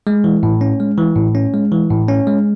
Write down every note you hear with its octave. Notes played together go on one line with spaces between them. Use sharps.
G#3
E3
A2
C#4
G#3
E3
A2
C#4
G#3
E3
A2
C#4
G#3